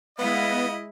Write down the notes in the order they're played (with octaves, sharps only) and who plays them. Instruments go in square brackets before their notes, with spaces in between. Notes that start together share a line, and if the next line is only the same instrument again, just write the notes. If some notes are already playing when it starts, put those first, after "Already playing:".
[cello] G#3 E4 [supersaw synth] B3 [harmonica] D#5 [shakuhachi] F5